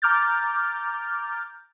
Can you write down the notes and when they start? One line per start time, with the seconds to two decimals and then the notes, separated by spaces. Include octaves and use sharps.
0.02 A#5 D6 F6 G6 A6